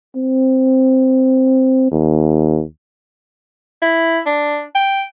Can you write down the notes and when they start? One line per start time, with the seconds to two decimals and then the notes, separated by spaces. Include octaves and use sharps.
0.16 C4
1.91 D#2
3.82 E4
4.26 D4
4.75 G5